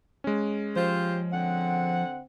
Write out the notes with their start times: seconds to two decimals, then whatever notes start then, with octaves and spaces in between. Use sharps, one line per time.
0.24 G#3 C#4
0.76 F3 F4 G4 C5
1.32 D3 C4 F#5